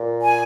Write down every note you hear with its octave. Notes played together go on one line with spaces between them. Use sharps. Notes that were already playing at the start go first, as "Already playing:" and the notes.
Already playing: A#2
G#5